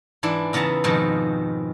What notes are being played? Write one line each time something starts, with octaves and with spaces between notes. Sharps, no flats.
G#2 E3 D4 E4
E2 C#3 B3 A5 A#5
F2 G#2 B2 D#3 F3